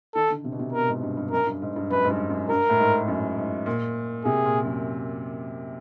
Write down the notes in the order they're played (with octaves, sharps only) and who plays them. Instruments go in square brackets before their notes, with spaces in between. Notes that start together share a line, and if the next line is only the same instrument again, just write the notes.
[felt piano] D#3 [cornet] A4
[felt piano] D3
C3
B2
C3
[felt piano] B2 [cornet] A#4
[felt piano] G#2
G2
G2
[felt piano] F#2 [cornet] A#4
[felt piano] G2
G#2
G2
[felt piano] F#2 [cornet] B4
[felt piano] G#2
G2
F#2
[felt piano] G2 [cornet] A#4
[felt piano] A2
G#2
F#2
G#2
A#2
[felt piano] C3 [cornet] G#4
[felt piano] A#2
F#2